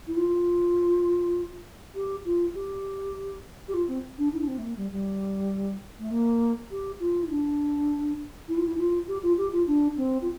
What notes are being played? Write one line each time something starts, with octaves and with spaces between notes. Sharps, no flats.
E4
F4
G4
F4
G4
G4
F4
C4
D4
E4
D4
C4
A3
A#3
G3
G3
A3
A#3
G4
F4
E4
D4
E4
F4
E4
F4
G4
F4
G4
F4
D4
C4
F4